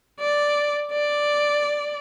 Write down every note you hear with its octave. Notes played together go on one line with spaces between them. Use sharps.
D5
D5